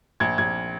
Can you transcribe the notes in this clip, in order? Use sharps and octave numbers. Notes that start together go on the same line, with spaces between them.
A#1 G#6
A#1 G#6